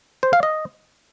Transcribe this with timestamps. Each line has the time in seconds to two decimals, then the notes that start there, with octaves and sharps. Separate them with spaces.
0.23 C5
0.33 F5
0.43 D#5